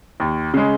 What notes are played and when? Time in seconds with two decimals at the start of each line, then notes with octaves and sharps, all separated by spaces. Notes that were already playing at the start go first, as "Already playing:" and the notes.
0.20 D#2
0.54 C#3 G#3